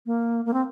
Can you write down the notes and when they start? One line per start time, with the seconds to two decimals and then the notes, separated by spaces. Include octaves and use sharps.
0.06 A#3
0.45 A#3
0.53 C4